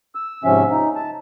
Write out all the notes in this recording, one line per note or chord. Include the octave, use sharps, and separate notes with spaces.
E6
G#2 C3 F3 C#4 E5
D#4
A5